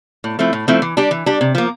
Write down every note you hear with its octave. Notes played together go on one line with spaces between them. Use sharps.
A2
F3 A3 C4 E4
A2
F3 A3 C4 E4
E3
G3 D4 G4
E3
G3 D4 G4
C3
F3 A#3